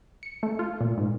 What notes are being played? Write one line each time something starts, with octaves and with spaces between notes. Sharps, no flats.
C#7
A3
F4
A#2
G#2